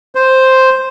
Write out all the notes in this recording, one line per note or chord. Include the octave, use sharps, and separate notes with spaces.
C5